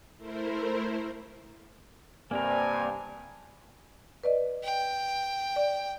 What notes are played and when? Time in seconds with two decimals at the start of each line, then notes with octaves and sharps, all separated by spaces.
0.17 A3 E4 A#4 C5
2.31 G2 C3 A#3 C4 A#4 D5 G#5
4.24 B4 D5 D#5
4.63 G5
5.56 D5